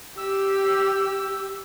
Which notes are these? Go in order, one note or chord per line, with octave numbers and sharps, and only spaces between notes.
G4 E6